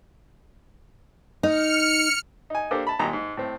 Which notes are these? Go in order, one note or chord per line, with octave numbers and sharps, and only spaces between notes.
D#4 F6 C#7
D#4 G#5
A#3 D4 G4 A4 C5
A5 B5
G#1 A#2 G4 A#5
G#2
A2 C4